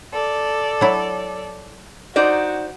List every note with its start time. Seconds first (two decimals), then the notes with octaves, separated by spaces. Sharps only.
0.13 A4 D5
0.81 F#3 E4
2.16 D#4 F#4 C5 D5